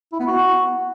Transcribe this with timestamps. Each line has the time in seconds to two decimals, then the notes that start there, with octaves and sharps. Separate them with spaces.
0.12 E4
0.20 B3
0.27 F#4